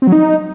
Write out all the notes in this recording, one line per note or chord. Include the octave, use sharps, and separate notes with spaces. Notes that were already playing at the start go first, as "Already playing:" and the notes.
C4
F#3
D#4